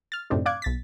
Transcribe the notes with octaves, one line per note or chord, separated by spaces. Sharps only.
F6 A6
F#2 A2 C3 C4 D4 D#4
D5 F5 D6 F#6 G#6
B1 A6 B6